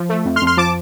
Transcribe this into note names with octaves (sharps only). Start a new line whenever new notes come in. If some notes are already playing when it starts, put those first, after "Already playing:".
Already playing: F3
A3
F2
C6 F6
F2
C6 F6
F3 A5 D6